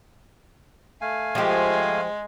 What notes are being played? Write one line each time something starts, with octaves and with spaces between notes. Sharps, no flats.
A3 F5 G#5
F3 G#3 G4